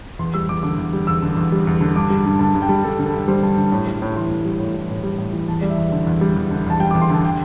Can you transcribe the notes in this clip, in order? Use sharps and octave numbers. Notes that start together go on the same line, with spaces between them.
E2 C6
G3 E6
E2 D6
D3 D6
E2
G3
E2 E6
D3
E2
G3
E2
D3
G2 D6
G3
G2
D3 A5
G2
G5
G3
G2 A4
D3
A4
G2
G3 C5
G2
D3
A2
G3
A2
E3 C6
A2
G3
A2
E3
A2
G3
A2
E3
E2 A5
G3 D5
E5
E2
D3
E2
G3
E2
D3
E2 A5
G3 G5
D6
E2
C6
D3 A5
G5